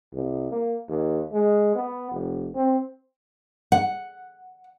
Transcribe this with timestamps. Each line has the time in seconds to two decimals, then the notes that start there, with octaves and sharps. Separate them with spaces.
0.13 C2
0.52 A#3
0.89 D#2
1.32 G#3
1.75 B3
2.11 F1
2.55 C4
3.72 F#5